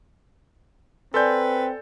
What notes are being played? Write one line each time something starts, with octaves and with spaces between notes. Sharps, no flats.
C4 A4 B4 D5 G#5 C6 G6